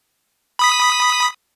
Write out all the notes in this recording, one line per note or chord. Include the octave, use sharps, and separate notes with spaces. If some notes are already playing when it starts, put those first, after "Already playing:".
B5 D#6 B6